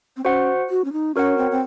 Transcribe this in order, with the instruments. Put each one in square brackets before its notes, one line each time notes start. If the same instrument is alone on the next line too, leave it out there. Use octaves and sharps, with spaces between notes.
[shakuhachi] C4
[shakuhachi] C#4 [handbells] F#4 C5 F#5
[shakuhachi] F#4
C#4
D#4
[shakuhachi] C#4 [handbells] F#4 A#4 C#5 F#5
[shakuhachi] C4
C4